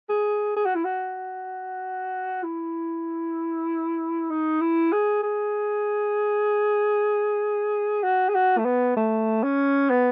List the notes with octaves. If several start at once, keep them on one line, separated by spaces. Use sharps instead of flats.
G#4
G#4
F#4
E4
F#4
E4
D#4
E4
G#4
G#4
F#4
G#4
F#4
A3
B3
A3
C#4
B3